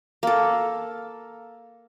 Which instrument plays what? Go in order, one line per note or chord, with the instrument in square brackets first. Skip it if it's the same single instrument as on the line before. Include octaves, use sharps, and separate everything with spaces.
[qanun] A#3 A4